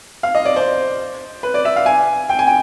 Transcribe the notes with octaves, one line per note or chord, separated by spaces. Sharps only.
F5
D#5
D5
C5
B4
D5
E5
F5
G#5
G5
G#5
G5